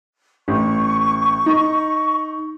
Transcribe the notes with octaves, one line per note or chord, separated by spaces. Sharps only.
A1 C#6
D#4